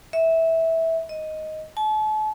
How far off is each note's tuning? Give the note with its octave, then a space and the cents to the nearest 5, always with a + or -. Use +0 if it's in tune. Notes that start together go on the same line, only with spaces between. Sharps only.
E5 -15
D#5 +5
A5 -40